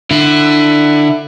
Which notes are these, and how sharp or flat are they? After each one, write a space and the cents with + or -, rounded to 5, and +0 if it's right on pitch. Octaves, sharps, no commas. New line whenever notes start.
D3 +20 E4 +10